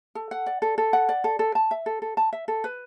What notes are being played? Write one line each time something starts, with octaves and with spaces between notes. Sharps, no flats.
A4
F#5
D5
A4
A4
F#5
D5
A4
A4
A5
E5
A4
A4
A5
E5
A4
B4